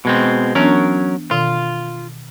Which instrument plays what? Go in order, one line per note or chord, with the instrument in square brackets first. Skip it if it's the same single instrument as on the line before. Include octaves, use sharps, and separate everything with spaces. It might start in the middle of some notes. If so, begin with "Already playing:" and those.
[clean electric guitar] B2 G#3 C4
[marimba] E3 B3 D4 [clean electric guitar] F#3 C#4 A#4
[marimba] B2 D#3 [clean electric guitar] F4